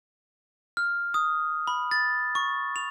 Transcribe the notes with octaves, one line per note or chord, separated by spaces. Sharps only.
F6
D#6
B5
A6
C#6
F7